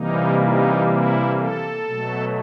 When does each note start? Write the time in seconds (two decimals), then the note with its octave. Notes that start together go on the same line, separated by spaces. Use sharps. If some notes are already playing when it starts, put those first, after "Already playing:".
Already playing: C3 E3 G3 A#3 D#4
0.40 D#4
0.89 E4
1.37 A4
1.86 B2 F#3 A3